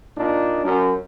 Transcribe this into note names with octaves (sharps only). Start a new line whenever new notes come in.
A#2 D4 D#4
F#2